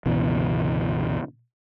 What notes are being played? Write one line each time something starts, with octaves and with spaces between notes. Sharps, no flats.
G1 C#2 B2 E3